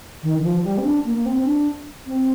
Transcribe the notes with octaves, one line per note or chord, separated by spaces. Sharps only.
D#3
D#3
F3
F3
G3
C4
D4
A#3
A#3
C4
D4
C4